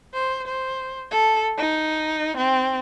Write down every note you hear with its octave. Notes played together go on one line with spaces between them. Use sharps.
C5
C5
A4
D#4
C4